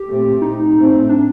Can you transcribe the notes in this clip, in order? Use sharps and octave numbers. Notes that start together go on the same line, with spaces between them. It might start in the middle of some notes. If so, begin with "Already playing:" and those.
Already playing: G4
A#2 A3 C4
D#4
A2 A3 C4
D4